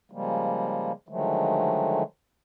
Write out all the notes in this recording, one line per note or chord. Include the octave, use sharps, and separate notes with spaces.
C#3 F3 G3 G#3 A#3
D3 D#3 F3 F#3 G#3 A3